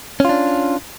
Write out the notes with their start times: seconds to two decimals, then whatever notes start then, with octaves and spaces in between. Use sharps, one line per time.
0.20 C#4
0.25 F4
0.29 D4